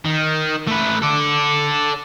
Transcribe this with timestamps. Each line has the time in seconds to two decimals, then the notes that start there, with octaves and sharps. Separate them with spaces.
0.05 D#3
0.68 A3 B4
1.02 A4 D5